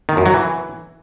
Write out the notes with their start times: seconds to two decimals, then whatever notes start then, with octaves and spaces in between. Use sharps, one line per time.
0.09 D#3
0.17 F#2
0.26 F#3
0.34 E3